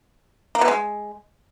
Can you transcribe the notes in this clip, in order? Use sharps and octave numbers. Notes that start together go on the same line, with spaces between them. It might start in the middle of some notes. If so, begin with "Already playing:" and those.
A#3
B2
G#3